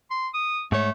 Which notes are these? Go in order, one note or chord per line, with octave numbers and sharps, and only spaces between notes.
C6
D#6
G#2 A3 C#5